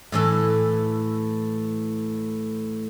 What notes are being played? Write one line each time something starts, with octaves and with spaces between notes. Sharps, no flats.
A2 E3 A4